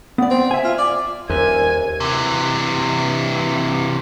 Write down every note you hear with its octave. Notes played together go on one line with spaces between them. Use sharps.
B3 D5
C4
E5 G#5
F4
D5
D#1 D#2 A#4 C5 E5 G#5 G#6
C3 E3